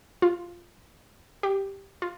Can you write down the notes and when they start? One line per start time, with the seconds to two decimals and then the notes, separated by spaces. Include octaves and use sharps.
0.22 F4
1.43 G4
2.02 F4